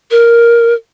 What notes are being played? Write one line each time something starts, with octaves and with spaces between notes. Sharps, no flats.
A#4